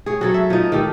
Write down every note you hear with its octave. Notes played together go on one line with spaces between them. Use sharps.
G#4 C#5
F#3 A4 C#5
E5
F3 D#4
D#3 G4 A4